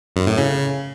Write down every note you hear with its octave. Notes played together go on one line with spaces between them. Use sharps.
F#2
A2
C#3